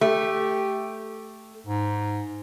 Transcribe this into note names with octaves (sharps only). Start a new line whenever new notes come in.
A3 G4
G#2